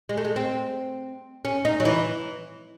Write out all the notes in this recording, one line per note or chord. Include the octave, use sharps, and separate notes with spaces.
G#3
A3
G#3
C4
C#4
D#4
F#3
E3